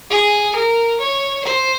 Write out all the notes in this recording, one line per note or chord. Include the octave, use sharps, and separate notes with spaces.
G#4
A#4
C#5
C5